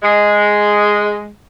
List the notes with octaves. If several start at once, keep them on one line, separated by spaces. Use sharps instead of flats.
G#3